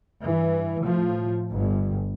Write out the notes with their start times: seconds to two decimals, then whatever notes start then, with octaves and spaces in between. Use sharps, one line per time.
0.23 G2 E3
0.80 A2 F3
1.49 G1 G2